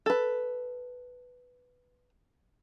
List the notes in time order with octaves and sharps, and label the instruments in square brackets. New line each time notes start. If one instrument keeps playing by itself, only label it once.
[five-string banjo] A4 B4